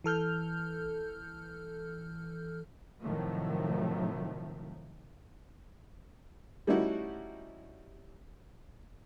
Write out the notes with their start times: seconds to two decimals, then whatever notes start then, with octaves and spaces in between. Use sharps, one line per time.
0.04 E3 A4 F6 G6
3.03 A2 C3 D#3 F3 F#3 A3
6.67 G3 A3 C#4 D#4 E4 F#4